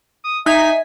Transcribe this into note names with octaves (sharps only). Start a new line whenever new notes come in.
D#6
D#4 E5 G#5 B6